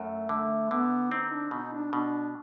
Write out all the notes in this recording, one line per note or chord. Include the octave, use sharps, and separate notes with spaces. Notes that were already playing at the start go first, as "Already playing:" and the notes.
Already playing: F#2 A3
D3 A3
D3 B3
C4 D#4
D4
B2 D#4
D4
B2 D4